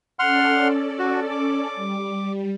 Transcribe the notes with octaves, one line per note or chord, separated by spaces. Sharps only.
C#4 A4 D5 F#5 C6 F6
F#4
D6
G3